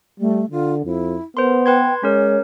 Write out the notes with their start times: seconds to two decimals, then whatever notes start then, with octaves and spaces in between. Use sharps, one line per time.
0.20 G3 A3
0.51 D3 F4
0.85 F2 E4
1.37 B3 A#4 C5 C6
1.66 B4 G5 C6 G#6
2.03 G#3 C#4 A#4 C#5